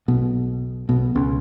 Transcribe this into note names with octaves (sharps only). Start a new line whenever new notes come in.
B1 B2
B1 B2
C#2 C#3